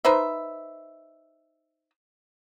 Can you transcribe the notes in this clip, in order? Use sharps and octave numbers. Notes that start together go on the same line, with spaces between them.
D#4 B4 C5 E5